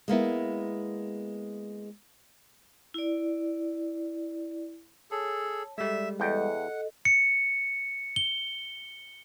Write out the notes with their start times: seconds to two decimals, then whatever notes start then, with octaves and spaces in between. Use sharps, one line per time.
0.08 G#3 A#3 B3 E4
2.94 E4 D5
5.11 G#4 A4 C#5 A5
5.78 G3 G#3 A4 D5 E5
6.20 E2 A4 D#5 F#5 G5
7.05 C#7
8.16 G7